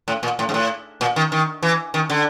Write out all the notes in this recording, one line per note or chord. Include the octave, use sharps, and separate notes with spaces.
A2
A#2
A2
G#2
A2
A#2
D#3
D#3
E3
D#3
D3